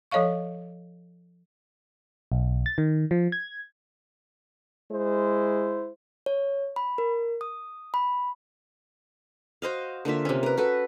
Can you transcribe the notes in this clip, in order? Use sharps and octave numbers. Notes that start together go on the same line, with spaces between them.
F3 A4 C#5 D#5 F5 C#6
B1
A6
D#3
F3
G#6
G#3 E4 C5
C#5
B5
A#4
D#6
B5
F#4 C5 D#5 F5
D3 A#3 F4 E5
C3 C#4
A#4 B4
F#4 A4 B4